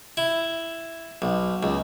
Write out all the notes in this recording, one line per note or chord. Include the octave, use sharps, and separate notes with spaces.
E4
B1
C#2